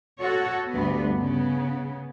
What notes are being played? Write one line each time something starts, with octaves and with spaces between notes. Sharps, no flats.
F#4 A4 C#5
D2 G2 A3 B3
C#3 B3